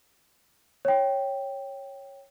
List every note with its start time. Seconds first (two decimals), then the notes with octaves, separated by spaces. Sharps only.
0.85 C#5 G5